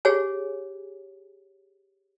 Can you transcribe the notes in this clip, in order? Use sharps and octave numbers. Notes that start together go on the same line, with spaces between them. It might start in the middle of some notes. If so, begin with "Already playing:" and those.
G4 G#4 C#5 G#5